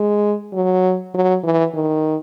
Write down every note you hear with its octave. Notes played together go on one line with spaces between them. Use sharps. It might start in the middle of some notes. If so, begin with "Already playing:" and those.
Already playing: G#3
F#3
F#3
E3
D#3